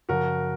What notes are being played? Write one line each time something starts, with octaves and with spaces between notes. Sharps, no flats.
F#2 C#3 F3 F#4 A#4